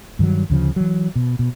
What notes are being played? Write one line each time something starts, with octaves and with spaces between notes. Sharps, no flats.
G2 D#3 F3 F#3
D2 C#3 F3
E3 F#3
B2
B2